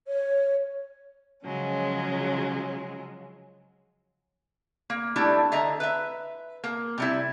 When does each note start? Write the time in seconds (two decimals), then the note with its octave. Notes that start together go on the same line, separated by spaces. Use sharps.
0.07 C#5
1.43 C#3 F3 F#3 G#3 C#4
4.90 A#3
5.16 G3 A3 D4 E4
5.52 D3 D#5 E5 A#5
5.80 B4 E5
6.64 A#3
6.98 C3 G3 E4